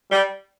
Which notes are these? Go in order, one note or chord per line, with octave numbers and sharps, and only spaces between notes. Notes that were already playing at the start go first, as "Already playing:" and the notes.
G3